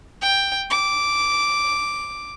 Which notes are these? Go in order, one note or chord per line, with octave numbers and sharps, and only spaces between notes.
G5
D6